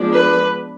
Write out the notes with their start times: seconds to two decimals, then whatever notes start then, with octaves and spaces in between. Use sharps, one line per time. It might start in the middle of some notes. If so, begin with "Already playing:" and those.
Already playing: F3 G#3 B3 D4
0.12 B4